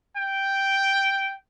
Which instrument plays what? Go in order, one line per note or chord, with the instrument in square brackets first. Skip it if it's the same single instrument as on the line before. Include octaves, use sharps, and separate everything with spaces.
[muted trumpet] G5